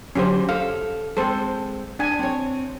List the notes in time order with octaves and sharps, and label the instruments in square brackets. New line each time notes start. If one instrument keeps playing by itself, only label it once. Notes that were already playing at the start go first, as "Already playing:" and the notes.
[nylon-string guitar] D3 F#3 [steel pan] C#4 G4 C5
[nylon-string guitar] A4 [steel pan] F5
[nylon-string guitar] G#3 C4 G#4 [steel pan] A4 C5
[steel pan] D4 G#5
[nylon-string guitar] C4 C#5